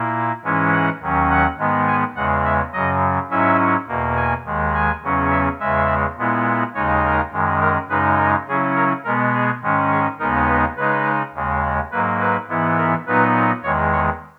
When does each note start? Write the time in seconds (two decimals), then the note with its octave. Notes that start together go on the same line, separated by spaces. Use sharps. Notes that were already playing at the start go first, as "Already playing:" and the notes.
Already playing: A#2 A#3 E4
0.43 G#2 E3 G#3 C#4 E4
0.72 F#5
1.01 D#2 D#3 F#3 C#4
1.30 F#5
1.58 G#2 D#3 G#3 B3
1.87 G#5
2.16 E2 C#3 G#3 F#5
2.45 E5
2.73 F#2 C#3 F#3 D#5
3.30 G#2 F#3 C#4 E4 E5
3.88 E2 B2 A#3
4.16 G#5
4.45 D#2 D#3 G#3
4.74 G#5
5.03 E2 C#3 F#3 C#4
5.31 E5
5.60 E2 C#3 G#3 E5
6.17 A#2 G#3 B3 E4
6.75 D#2 C#3 G#3 D#4 C#5
7.04 A#4
7.32 F#2 D#3 G#3
7.61 A#4
7.89 F#2 C#3 G#3 D#4 B4
8.18 A#4
8.47 C#3 F#3 C#4 E4 G#4
8.76 A#4
9.04 B2 G#3 B3 A#4
9.33 G#4
9.62 G#2 D#3 G#3 C#4
9.91 G#4
10.19 D#2 C#3 G#3 B3 D#4 A#4
10.48 B4
10.77 C#3 G#3 D#4 B4
11.34 D#2 C#3 G#3
11.91 G#2 F#3 A#3 B4
12.20 B4
12.48 G#2 E3 B3 E4
12.77 A#4
13.06 A#2 F#3 B3 D#4 B4
13.63 E2 D#3 G#3 C#5
13.92 C#5